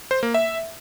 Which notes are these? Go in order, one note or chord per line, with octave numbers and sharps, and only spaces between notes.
C5
A#3
E5